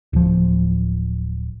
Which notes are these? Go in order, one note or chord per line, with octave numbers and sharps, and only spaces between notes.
D1 F3